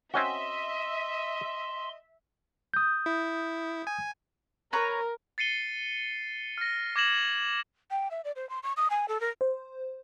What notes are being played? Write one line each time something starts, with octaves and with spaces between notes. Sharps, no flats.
C4 C#4 F#4 D#5 E5 C6
D#6 G6
E4
G#5
A#4 B4 C#5 A#5
A6 C7 C#7 D#7 G7
F6 A#6
D6 G#6 A#6 E7 F#7
G5
E5
D5
C5
C6
C#6
D#6
G#5
A4
A#4
C5